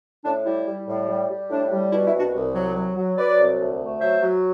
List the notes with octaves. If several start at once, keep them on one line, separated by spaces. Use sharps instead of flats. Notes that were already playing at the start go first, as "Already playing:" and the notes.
A2 D4
G3 E4
G3
A2
G3
G3
A2 D4
G3
B2 E4
E4
C2
D4 F#4
C2
F#3
F#3
F#3
F#3 B4 D5
C2
D2
A3
F#3 C5 E5
F#3